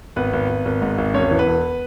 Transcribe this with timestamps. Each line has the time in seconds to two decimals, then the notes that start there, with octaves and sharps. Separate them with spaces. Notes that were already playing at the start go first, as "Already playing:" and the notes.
0.16 G#1 B3 B4
0.33 G#1
0.49 G#1
0.65 G#1
0.82 G#2
0.98 G#1
1.14 E1 C#4 C#5
1.31 E3
1.39 B3 B4
1.47 E1